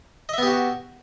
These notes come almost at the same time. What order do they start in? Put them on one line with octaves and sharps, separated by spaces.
D#5 E5 B3 G4 F#4